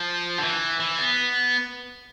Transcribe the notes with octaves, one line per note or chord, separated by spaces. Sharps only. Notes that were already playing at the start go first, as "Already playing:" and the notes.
Already playing: F3
D3
E3
E3
B3